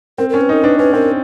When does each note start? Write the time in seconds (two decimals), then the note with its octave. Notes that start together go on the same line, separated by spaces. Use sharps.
0.18 C4 A#4
0.29 C#4 A#4
0.41 B4
0.49 D#4 A#4
0.64 D4 B4
0.79 C#4 B4
0.93 C4 A#4